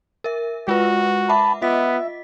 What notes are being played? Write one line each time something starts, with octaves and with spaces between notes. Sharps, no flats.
A#4 E5
G#3 F4 F#4 B4
E5 F#5 A5 B5 D6
B3 F4 D#5 E5 B6